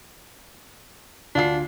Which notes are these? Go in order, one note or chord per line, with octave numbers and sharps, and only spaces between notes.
D2 D4 F4 C7